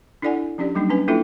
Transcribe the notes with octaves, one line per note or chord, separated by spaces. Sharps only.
D4 E4 A4 D5 F#5 G#5
F3 C#4 D4 G4 D5
F#3 G3 A#3 D4 D#4
C#4 D4 B4 G#5
A#3 D4 E4 F4 A4 E5